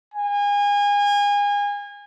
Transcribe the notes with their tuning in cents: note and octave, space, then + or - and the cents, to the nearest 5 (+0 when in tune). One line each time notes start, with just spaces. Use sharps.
G#5 -30